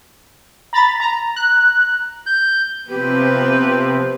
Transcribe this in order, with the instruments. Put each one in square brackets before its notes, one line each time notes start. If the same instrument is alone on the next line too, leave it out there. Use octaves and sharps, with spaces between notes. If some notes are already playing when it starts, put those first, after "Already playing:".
[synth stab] A#5 B5 A6
A#5
[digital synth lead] F#6
[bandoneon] G6
[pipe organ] C3 F3 C4 [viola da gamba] B3 B4 [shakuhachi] G4